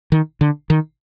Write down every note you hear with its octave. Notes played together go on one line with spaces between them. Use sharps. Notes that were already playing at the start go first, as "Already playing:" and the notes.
D#3
D3
D#3